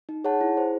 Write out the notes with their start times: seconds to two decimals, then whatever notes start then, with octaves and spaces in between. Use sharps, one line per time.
0.09 D#4
0.24 G#4 C#5 F#5 A5
0.41 E4
0.57 G#4 C5